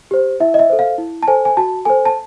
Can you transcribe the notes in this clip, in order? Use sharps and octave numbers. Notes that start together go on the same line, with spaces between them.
G4 C5
E4 E5
D#5
E5
A4 C5
F5
E4
A5
A4 C5 G#5
G#5
F#4 A5
A4 C5 G#5
A5